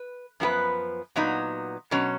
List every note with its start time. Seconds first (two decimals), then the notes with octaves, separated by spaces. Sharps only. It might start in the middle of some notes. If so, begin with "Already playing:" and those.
Already playing: B4
0.40 F#2 F3 B3 F#4 B4
1.16 A#2 F#3 B3 D#4
1.91 B2 F#3 C#4